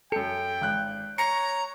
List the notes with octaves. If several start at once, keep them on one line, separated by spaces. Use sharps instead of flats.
F#2 A4 G5 C#7
G#1 F#6
C#5 A#5 C#7